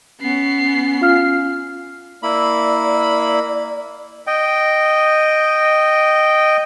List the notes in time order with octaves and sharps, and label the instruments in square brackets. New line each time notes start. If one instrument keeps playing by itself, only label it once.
[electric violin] B3 C7 [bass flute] C#4
[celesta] F4 F5 F6
[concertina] A#3 E4 B5 [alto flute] D5
[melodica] D#5 G5